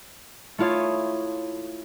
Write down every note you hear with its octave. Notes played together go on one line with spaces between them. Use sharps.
A3 E4 F4 C#5 D#6